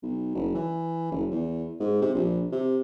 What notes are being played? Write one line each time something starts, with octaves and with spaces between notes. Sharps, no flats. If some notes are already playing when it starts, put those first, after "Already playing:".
B1
F#1
E3
F#1
E2
G#2
C3
A#1
C3